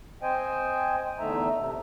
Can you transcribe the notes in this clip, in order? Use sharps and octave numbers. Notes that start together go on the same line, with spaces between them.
C4 C5 D#5 G5 G#5
E2 D3 A3 D#4 E5 A#5
C3